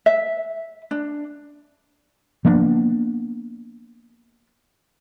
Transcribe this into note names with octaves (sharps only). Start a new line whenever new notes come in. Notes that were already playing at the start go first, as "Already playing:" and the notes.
E5
D4
F3 A#3 B3 D4